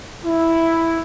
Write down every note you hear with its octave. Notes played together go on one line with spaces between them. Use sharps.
E4